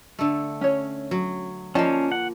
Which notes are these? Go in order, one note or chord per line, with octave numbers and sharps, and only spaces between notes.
D3 A3
C#4 C#5
F#3
F3 A#3 C#4 D5 D#5 A5
F#5